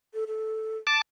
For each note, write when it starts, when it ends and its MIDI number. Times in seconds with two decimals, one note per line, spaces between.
0.14 0.25 69
0.27 0.77 69
0.87 1.01 81
0.87 1.01 86